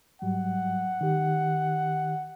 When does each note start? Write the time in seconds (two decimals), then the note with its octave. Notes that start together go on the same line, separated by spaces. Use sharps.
0.22 G#2 F#3 G3 F#5
1.01 D#3 G4